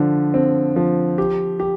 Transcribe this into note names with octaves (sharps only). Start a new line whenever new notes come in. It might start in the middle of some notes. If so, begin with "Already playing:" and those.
Already playing: D3 F3
C4
F3
G4
G4